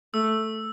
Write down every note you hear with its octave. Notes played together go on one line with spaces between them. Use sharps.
A3 E6